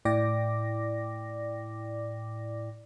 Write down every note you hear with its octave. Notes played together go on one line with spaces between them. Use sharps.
A2 E4 D5 G5 D6 A#6